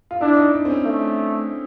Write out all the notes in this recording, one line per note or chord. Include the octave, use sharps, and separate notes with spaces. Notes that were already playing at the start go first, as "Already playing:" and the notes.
F4
D4 E4
D#4
D4
C4
C#4
A3